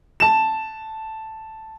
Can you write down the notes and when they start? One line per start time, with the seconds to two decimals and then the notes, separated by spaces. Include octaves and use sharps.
0.20 A5 E7